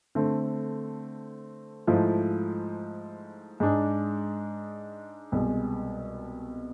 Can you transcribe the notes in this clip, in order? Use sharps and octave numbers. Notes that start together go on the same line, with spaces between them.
D3 A3 C4
G#2 F3 A3 E4
G#2 G#3 D4
C2 B2 G#3